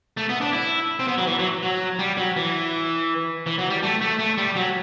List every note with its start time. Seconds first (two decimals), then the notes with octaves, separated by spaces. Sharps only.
0.17 A3
0.29 B3
0.41 D4
0.53 E4
0.99 C4
1.08 B3
1.18 F#3
1.27 E3
1.39 F#3
1.63 F#3
1.99 G3
2.18 F#3
2.36 E3
3.46 E3
3.59 F#3
3.70 G3
3.83 A3
4.01 A3
4.19 A3
4.38 G3
4.56 F#3